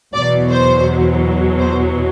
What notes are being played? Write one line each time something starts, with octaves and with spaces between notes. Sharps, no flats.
E2 B2 F#3 D5
C5
C5